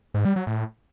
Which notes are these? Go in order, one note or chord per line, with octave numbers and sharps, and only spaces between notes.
G#2
G3
F#3
A2